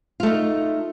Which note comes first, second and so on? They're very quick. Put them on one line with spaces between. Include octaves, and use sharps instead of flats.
F4 A3 D#4